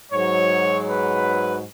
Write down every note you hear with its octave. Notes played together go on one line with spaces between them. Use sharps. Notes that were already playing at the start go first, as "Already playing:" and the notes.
G#2 F#3 C#5
B4